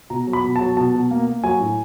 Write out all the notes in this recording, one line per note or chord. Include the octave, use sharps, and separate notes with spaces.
B2 A#5
F#3
B5
B2
A5
F#3
B2 A5
B2
A#3
A#3
F#3 G#5
A2